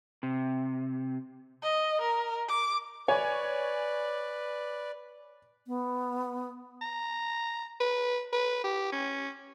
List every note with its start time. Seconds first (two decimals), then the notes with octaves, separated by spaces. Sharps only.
0.23 C3
1.63 D#5
2.01 A#4
2.49 D6
3.08 B4 C#5 D5 G#5
5.67 B3
6.81 A#5
7.81 B4
8.33 B4
8.64 G4
8.92 C#4